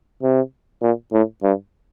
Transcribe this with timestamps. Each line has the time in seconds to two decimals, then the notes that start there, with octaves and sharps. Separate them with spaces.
0.23 C3
0.82 A#2
1.13 A2
1.43 G2